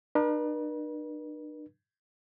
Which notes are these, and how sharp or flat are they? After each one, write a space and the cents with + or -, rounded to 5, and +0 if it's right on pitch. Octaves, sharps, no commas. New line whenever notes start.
D4 +45 B4 -45